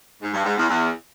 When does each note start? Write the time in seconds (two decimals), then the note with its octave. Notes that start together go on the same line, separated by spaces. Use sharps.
0.22 G#2
0.33 G2
0.45 G#2
0.57 E2
0.69 E2